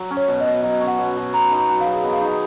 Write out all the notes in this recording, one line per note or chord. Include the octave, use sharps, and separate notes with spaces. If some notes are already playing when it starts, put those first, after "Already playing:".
Already playing: F#3
C#4
C#5
B2
D#5
B2
F#3 D#5
C#4
F#5
B2
B2
B3 A#5
D#4
A#5
F#3
F5
G#4
B3 D#5
F5
D#4 D#5